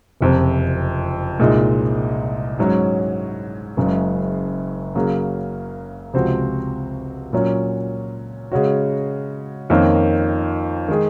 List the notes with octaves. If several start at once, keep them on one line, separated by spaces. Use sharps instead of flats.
F#1 F2 C3
C2 A#2 G#3 D#4
G#2 F#3 C#4
F#1 F#2 C#3 G#3
C#3 F#3 A#3
C#2 C3 F3 C4 F#4
A#2 F#3 C#4
C#3 G#3 C#4 F#4
F2 D#3 A#3 C#4
D#3 G#3 D#4 G#4